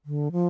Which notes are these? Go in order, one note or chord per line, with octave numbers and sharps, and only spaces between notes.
D3
F3